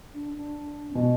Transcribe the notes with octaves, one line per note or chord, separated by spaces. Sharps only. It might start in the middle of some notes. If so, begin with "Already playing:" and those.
D4
D4
C#4
B2 B3